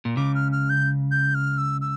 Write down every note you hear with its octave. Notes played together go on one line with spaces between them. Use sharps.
A#2
C#2 C#3 D6
F6
F6
G6
G6
F6
E6
E6